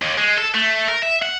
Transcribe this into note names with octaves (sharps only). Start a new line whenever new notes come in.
D#2
G#3
A4
A3
A#4
E5
F#5